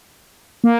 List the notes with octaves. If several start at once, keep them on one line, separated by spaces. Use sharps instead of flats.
A#3